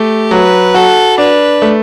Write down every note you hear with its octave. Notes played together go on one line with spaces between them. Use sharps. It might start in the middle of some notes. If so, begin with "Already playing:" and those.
Already playing: A3 G4
F#3 B4
F#4 A4
D4 B4
A3